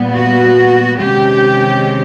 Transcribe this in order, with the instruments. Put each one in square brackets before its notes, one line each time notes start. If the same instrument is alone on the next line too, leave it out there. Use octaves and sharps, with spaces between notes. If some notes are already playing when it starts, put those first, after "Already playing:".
Already playing: [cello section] A#2 G3 B3
F#4
C3 D#3 G#3 C#4 G4